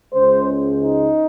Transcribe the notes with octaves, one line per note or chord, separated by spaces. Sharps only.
C#2 C#3 G#3 C5
D#4